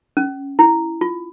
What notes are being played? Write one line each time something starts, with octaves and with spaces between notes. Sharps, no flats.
C#4
E4
F4